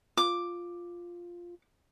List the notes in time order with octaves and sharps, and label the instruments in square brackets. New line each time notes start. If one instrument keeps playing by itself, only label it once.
[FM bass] F4 [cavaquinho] D6